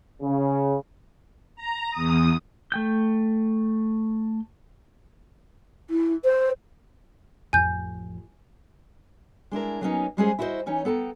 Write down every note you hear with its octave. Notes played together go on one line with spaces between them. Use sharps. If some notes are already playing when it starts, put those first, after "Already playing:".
C#3
A#5
E2 D#6
A3 G5 G6
E4
C5
A1 F2 G#5 G6
G#3 D4 E4 A#4
F#3 G#3 A#3 B3 C#4 D#4
G3 G#3 C#4 G#4 C5
E4 F#4 A4 B4 C5 D#5
E3 C#4 D#4 C#5
B3 A4 G5 A5 A#5